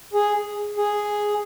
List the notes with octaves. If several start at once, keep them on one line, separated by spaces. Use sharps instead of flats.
G#4
G#4